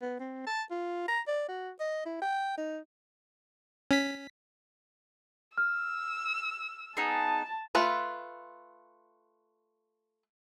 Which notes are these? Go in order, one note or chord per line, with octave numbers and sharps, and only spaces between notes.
B3
C4
A5
F4
A#5
D5
F#4
D#5
E4
G5
D#4
C#4 B6
E6 F6
B3 D#4 G#4 A5
A3 F4 B4